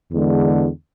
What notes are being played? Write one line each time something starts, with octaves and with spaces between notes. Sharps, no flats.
E2 D3 G#3